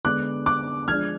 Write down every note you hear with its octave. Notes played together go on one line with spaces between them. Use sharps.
D3 G#3 B3 D4 D6 F#6
D6 F#6
F3 G#3 D4 F6 G#6